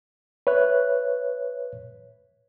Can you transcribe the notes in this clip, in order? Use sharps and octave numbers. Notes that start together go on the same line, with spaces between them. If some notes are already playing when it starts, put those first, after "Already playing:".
B4 C#5 E5 F#6